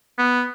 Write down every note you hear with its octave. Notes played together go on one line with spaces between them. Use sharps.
B3